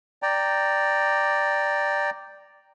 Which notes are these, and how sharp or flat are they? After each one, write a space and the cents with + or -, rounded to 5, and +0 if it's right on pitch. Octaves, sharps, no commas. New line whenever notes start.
D5 +0 G5 +0 A#5 -10